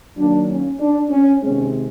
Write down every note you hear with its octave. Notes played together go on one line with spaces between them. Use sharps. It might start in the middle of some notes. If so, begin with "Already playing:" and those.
D#3 F#3 A#3 D4
C#4
D4
C#4
C3 D#3 G#3 C4 C#4